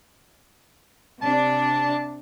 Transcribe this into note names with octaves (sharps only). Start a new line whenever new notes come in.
C3 D4 A5